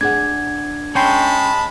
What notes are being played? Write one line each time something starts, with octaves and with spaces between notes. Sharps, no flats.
D4 G#4 F#5 G#6
G#3 C#4 G5 A5 B5 C6